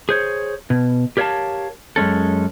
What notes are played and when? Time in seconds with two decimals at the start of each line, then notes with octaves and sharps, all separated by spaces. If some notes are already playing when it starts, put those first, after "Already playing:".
0.09 G#4 C5 C#5
0.70 B2
1.17 G4 A#4 C#5 E5 F5 A5
1.96 F#2 G#3 C#4 A4